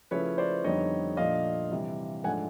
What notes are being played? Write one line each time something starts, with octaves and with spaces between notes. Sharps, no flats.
C#3 F3 A3 C#4 E4 B4 C#5
C5 D5
F2 D3 G3 B3 D#4 C#5 D#5
A#2 F3 A3 D4 D#5 F5
C3 E3 G3
G#2 F3 A3 D4 F#5 G#5